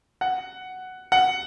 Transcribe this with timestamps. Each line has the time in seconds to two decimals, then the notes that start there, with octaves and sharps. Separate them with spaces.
0.21 F#5
1.12 F#5